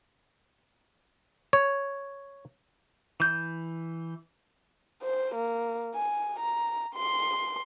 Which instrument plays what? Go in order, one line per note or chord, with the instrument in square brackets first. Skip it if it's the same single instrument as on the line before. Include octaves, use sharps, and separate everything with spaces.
[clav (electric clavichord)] C#5
[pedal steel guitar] E3 G6
[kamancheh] C5
A#3
G#5
A#5
C6